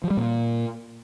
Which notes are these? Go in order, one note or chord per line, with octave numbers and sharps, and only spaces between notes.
F3
G3
A#2